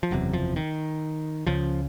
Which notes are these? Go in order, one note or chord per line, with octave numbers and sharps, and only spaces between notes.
F3
F#1 E2 C3 F#3
F3
D#3
C#2 C#3 F3